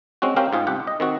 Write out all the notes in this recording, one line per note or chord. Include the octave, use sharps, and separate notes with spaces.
G#3 C4 C#4 F#4
C4 C#4 G4 A#4 F5 G5
G#2 F4 G#4
C2 G4 F#5
D#5
D#3 C4 F#4